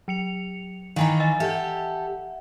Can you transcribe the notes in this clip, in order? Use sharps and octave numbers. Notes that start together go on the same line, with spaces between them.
F#3 C#7 F7
D#3 E3 D#4 F5 G#5 A#5
D#5 G#5 A6
G4 A4 E5 F#5